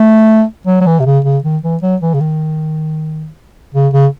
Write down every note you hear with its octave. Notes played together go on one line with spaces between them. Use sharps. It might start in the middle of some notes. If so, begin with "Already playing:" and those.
Already playing: A3
F#3
F#3
E3
C3
C#3
C#3
D#3
E3
F#3
E3
C#3
D#3
C#3
C#3